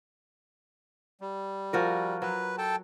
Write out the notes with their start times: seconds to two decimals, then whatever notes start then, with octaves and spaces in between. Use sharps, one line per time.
1.21 G3
1.73 F3 F#4 A#4
2.22 F#3 B4
2.58 A4 G5 A5